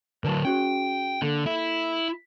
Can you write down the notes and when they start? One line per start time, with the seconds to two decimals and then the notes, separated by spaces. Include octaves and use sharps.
0.24 D3 F#3 A#4 B4 A5
0.45 C#4 F#4 G#4 G5
1.22 D3 A#3 A4
1.46 E4